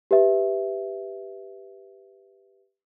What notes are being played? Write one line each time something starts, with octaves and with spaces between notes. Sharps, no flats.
G4 B4 E5